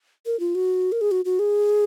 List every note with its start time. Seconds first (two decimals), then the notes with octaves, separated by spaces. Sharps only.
0.26 A#4
0.40 F4
0.55 F#4
0.92 A#4
1.01 G#4
1.11 F#4
1.25 F#4
1.39 G#4